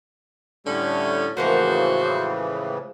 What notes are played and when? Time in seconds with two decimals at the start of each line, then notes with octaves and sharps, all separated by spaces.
0.67 A2 D3 G3 A3 C#4
1.37 A2 C#3 E3 F3 G#3 A#3 F#4 C5